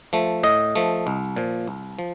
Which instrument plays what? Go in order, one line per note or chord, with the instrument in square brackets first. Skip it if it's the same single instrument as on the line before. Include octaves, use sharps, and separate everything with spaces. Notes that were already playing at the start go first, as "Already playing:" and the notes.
[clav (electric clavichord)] F3 A3
A2 D#5
F3 A3
C2
A#2 F3
C2
F3